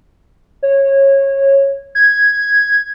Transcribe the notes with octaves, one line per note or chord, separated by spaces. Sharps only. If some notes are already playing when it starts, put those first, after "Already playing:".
C#5
G#6